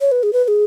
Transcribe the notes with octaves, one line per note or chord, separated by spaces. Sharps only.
C#5
B4
G#4
B4
B4
G#4